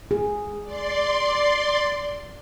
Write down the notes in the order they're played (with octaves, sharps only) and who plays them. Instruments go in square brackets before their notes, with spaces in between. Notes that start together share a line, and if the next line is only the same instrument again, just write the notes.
[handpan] G#4
[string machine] D5 C6